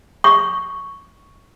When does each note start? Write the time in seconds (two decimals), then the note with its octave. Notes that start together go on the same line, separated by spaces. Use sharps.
0.24 C#6